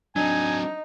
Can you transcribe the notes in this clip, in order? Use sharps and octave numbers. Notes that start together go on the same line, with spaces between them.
F#3 C4 D4 D#4 G#5